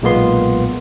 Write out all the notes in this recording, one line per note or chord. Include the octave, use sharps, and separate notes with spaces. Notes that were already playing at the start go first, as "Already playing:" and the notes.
B1 A#2 G#3 A#3 B3 C6